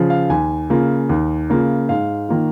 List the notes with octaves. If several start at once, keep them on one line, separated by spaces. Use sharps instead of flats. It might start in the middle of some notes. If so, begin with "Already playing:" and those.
Already playing: C#3 F3
F5
D#2 G#5
C#3 A#3 F4
D#2
C#3 A#3 F4
G#2 F5
D#3 A#3 F4